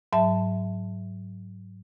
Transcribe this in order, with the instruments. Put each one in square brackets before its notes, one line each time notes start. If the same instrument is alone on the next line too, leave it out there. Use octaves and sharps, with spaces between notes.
[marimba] G#2 F#3 E5 A5